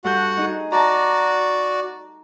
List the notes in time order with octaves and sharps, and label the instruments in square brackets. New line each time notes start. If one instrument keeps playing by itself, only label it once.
[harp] G2 A4 G6 [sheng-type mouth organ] F#4 F#5
[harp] D#4 G#4
[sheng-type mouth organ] F#4 D5 [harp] A5 A#5